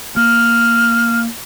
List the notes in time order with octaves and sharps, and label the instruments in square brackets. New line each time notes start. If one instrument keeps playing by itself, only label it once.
[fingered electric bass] A#3 [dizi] F6